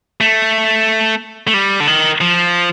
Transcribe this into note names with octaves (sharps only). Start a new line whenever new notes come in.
A3
A3
G3
D3
D#3
F3